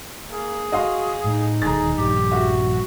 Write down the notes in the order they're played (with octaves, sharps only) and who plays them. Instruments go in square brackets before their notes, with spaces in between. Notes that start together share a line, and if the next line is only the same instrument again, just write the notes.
[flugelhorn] A#3 [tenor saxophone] G#4
[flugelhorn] F#4 [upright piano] D#5 F5 C6
[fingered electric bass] A2 [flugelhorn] D#4
[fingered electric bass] E1 D#2 [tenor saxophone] G#4 [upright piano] A#5 A6
[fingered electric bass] A#1 G2 [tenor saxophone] G4
[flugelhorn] F#4 [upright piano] E5